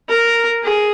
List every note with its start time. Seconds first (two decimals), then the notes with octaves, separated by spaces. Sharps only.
0.09 A#4
0.64 G#4